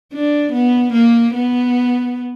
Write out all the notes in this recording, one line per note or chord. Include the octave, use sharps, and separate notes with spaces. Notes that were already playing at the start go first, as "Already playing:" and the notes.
D4
B3
A#3
B3